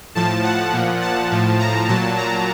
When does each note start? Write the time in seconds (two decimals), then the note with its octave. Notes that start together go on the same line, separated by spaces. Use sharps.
0.15 A2 F3 A5
0.44 F#5
0.73 A#2 F3
1.02 A5
1.31 A2 F3
1.59 A#5
1.88 A#2 F#3 A5
2.17 A#5